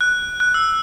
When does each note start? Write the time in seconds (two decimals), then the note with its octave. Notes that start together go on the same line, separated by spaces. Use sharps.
0.01 F#6
0.40 F#6
0.54 E6